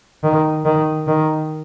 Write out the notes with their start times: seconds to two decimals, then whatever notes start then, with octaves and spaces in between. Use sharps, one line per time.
0.23 D#3
0.65 D#3
1.07 D#3